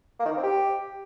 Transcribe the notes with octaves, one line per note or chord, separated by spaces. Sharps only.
A#3
D#3
D#4
C4
G4